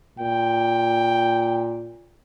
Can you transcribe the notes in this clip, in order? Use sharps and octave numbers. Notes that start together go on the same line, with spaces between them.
A#2 G5